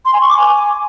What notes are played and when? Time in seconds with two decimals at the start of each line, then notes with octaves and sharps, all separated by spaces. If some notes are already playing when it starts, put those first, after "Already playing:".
0.05 C6
0.13 G#5
0.21 C#6
0.29 D6
0.37 G#5